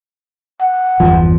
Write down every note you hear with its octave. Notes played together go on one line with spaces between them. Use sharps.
F#5
G1 E2 F3